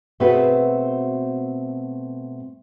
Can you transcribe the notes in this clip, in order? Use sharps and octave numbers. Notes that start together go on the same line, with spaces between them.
B2 A3 C4 F#4 G#4 B4